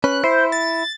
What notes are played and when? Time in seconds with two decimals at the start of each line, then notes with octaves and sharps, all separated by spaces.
0.04 C#4 B4 F#6
0.24 E4 C5
0.52 A6